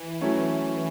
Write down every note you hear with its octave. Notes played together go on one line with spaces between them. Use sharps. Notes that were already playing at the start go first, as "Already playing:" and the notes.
Already playing: E3
F#3 A3 C#4 E4